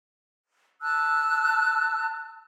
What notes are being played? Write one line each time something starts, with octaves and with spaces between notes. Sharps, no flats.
A5 E6 F#6